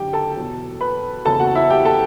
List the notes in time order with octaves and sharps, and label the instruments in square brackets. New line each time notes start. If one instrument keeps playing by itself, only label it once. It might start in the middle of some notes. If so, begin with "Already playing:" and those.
Already playing: [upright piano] F#1 F#2 D3 F#3 G4 G5
A4 A5
E2 B2 F#3
B4 B5
F#1 E2 C#3 F#3 A4 A5
F#4 F#5
E4 E5
G4 G5
A4 A5